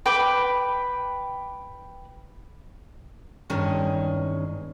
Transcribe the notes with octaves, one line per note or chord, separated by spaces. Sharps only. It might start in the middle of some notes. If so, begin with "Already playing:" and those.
B4 G5 D6
E2 G2 D#3 G#3 C#4 G#4